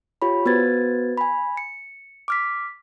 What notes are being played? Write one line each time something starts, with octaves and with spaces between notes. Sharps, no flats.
F4 G4 C#5 B5
B3 F#4 B4 C5 G#6 A6
G#5 B5
C#7
D6 F6 B6